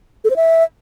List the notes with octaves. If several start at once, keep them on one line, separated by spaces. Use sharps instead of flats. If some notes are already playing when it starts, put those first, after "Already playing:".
A4
C5
E5